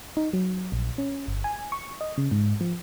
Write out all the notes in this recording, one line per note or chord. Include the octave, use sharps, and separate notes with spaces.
D#4
F#3
A#1
C#4
G1
G#5
C#6
D#5
C#3
G#2
F3